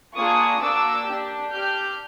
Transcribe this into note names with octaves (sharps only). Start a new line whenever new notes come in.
A#3 D4 F4 G#4 C#6 D#6
A#3 D4 F#4 D6 E6
D4 G4
D4 G4 F6 G6